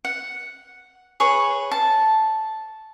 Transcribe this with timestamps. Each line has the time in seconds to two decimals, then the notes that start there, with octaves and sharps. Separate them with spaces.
0.05 F#5
1.20 G#4 B4 C#5
1.71 A5